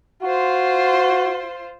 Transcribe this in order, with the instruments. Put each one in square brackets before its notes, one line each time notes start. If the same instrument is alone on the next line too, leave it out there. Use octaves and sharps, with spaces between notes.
[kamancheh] F4 C5 [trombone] F#4